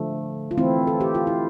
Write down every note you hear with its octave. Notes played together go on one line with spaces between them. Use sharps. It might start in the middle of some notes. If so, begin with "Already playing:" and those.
Already playing: D3 F3 A3
F4
E3 A3 C4 E4
A4
G4
F4
E4